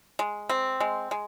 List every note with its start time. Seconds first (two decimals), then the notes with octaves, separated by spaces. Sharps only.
0.19 G#3
0.49 C4
0.80 G#3
1.11 G#3